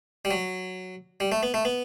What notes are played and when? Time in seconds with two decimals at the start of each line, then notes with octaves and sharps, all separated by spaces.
0.25 G3
0.31 F#3
1.20 G3
1.32 A3
1.43 B3
1.54 A3
1.65 B3